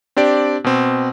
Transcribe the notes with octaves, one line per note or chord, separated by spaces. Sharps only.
C4 D4 G4 D5
B2 C4